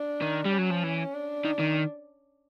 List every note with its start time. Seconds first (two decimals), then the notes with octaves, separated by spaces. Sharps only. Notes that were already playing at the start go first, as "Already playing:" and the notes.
Already playing: D4
0.22 D#3
0.46 G3
0.52 C#4
0.59 F#3
0.71 F3
0.84 E3
1.14 D4
1.45 D#3
1.60 D#3